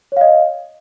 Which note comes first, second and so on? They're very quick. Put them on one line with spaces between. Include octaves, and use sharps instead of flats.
C#5 F5 D#5